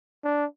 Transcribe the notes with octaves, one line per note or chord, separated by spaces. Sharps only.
D4